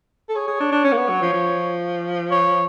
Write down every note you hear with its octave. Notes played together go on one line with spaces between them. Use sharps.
A4
G#4 C#5
G#4
D4
D4
C#4
A#3
B3
F#3
F3
F3
C#5